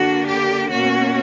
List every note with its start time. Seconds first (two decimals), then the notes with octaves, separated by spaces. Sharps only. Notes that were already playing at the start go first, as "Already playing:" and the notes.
Already playing: D3 A#3 D4 F#4
0.27 G4
0.70 B2 A#3 C#4 F#4